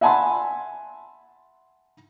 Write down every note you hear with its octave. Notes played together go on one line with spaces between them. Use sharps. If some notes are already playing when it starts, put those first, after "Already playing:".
E5 F#5 G#5 A5 B5 C6